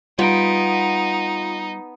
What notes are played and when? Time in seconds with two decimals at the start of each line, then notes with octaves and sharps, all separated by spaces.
0.19 G3 B3 D#4 F4 D7